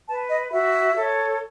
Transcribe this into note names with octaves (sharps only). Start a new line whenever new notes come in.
B4 A5
D#5
F#4 E5
A4 C#5